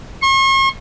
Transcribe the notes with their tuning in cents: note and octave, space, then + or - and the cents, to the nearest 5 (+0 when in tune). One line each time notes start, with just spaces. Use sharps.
C#6 -45